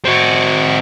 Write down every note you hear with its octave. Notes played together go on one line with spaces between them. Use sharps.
C4 F#4